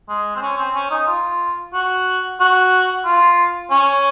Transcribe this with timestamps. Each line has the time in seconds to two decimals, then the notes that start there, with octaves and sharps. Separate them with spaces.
0.09 G#3
0.36 C4
0.42 C#4
0.58 C4
0.75 C#4
0.91 D#4
1.07 F4
1.74 F#4
2.40 F#4
3.05 F4
3.71 C#4